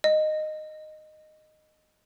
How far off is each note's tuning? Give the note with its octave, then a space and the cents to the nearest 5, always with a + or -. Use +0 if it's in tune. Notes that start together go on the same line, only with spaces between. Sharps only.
D#5 -10